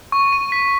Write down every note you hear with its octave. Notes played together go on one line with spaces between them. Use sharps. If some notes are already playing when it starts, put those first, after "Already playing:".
C#6
D#7
B6